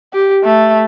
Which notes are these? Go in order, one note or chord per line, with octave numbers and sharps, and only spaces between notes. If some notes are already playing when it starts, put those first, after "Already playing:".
G4
A3